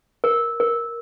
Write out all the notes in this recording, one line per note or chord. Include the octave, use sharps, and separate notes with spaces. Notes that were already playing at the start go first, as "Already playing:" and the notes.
A#4
A#4